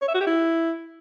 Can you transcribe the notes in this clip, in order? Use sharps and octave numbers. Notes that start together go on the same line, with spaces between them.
C#5
E5
F#4
G4
E4